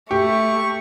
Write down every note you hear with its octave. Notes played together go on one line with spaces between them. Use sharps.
A3 G4 C#6